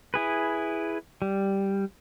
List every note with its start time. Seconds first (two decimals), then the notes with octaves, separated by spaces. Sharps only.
0.14 E4 G#4 B4
1.22 G3